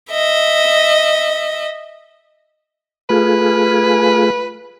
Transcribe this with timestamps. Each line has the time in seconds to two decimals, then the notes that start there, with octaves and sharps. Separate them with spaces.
0.11 D#5 E5
3.10 A3 F4 G#4 B4